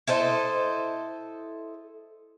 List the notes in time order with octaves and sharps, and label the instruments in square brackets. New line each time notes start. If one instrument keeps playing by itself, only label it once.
[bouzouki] E4 A4 C5 D#5